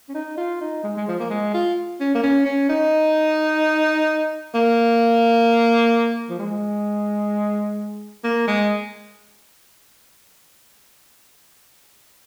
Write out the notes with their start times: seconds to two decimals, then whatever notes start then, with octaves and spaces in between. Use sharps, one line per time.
0.09 C#4
0.14 D#4
0.37 F4
0.61 D#4
0.83 G#3
0.97 G#3
1.08 F3
1.20 A#3
1.30 G#3
1.54 F4
2.00 C#4
2.15 A#3
2.23 C#4
2.45 C#4
2.69 D#4
4.54 A#3
6.29 F3
6.39 G#3
8.24 A#3
8.47 G#3